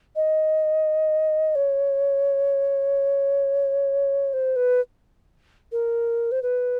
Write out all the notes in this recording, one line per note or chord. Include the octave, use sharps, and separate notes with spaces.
D#5
C#5
C5
B4
A#4
C5
B4